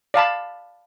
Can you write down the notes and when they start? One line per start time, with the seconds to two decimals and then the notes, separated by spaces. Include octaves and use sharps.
0.14 D5 F5 A5 B5